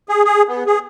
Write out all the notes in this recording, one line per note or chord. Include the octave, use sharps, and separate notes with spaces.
G#4
G#4
B3
G#4